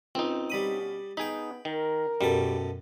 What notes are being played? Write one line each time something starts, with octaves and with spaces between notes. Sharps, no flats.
C#2 C4 D#4
B2 G3 B3 C#4 B5 D#6
B3 D#4 G#4 G5 B5
D#3 A#4
F#2 B2 G3 A4